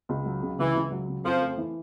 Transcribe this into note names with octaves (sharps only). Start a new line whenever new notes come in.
C#2
F#3
C#3
C#2 E3
C#2
F#3
C#3
F2 F3
A3
E3